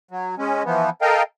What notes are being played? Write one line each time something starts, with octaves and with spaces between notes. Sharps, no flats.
F#3
G#3 C#4
E3 F3 B3
A4 A#4 D#5 F5 G5